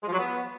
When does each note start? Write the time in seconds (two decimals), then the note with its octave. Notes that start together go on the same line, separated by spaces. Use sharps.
0.02 G#3
0.07 F3
0.12 F#3
0.18 B3